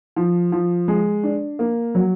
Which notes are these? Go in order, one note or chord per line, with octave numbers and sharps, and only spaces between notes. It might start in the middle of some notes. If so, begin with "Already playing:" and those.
F3
F3
G#3
D4
A#3
F#3